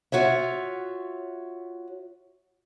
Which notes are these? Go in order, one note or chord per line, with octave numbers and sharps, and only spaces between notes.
F4 F#4 C#5 E5